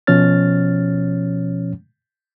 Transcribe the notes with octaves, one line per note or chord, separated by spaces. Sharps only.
B2 F3 C#4 C#5 F6 A6